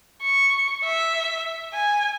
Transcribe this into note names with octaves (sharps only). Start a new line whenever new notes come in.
C#6
E5
G#5